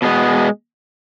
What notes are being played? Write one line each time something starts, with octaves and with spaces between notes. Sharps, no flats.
B2 G#3 B3